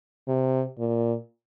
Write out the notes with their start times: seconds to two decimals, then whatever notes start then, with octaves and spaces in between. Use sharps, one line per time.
0.28 C3
0.79 A#2